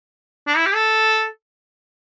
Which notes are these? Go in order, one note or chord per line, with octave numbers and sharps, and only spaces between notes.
D4
E4
G4
A4